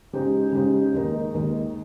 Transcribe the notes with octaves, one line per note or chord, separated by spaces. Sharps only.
C#3 G#3 D#4 G4 C5
C#3 G#3 D#4 G4 C5
D#2 D#3 G#3 D#4 A#4
D#2 D#3 G#3 D#4 A#4